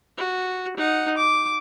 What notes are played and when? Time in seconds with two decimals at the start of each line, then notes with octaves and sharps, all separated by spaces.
0.17 F#4
0.77 D#4 F#5
1.17 D6